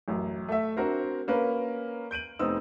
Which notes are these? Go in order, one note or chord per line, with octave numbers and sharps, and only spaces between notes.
A1 F#2
A3 E5
C4 D4 F#4 A#4 C5
A#3 C#4 A#4 B4
G6 D7 D#7 F#7
F1 B3 C4 D#4 D#6 E6